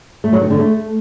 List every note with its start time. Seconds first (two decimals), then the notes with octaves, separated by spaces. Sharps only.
0.24 A3
0.33 F#3
0.41 D#3
0.50 D3
0.59 A3